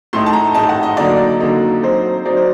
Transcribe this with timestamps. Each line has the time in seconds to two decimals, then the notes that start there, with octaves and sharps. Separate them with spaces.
0.13 A2 A3 D#4 C6
0.26 A5
0.33 A#5
0.54 A2 A3 D#4 A5
0.69 F#5
0.83 D#5
0.97 D3 F#3 A#3 D#4 D5
1.40 D3 F#3 A#3 D#4
1.82 F#3 C4 D#4 C5
2.25 F#3 C4 D#4 D5
2.37 C5